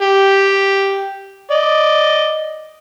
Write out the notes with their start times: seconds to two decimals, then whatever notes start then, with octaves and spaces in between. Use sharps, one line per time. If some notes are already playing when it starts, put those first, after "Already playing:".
0.01 G4
1.51 D5 D#5